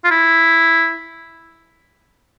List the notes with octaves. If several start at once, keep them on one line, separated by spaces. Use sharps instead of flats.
F4
E4